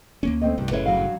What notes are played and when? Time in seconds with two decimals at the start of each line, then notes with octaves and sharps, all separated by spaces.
0.23 D2 A#3 C#4
0.42 A3 C4 D#5
0.58 C2 G2 G3
0.71 F#1 A2 C#3 B4 C#5 E5
0.86 G2 F#3 F5